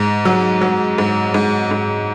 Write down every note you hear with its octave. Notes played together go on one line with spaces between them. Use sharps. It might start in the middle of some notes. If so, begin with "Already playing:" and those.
Already playing: G#2
F#3
F#3
G#2
G#2
G#2